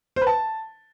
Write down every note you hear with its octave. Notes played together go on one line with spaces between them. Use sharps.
C5
B4
A5